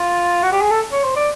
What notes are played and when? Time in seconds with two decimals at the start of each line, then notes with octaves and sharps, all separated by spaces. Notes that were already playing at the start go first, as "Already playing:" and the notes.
Already playing: F4
0.43 F#4
0.52 G4
0.61 G#4
0.70 A4
0.92 C#5
1.04 C5
1.16 D5